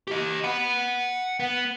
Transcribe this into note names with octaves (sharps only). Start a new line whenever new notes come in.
G4 D#5
F#5 B5
B3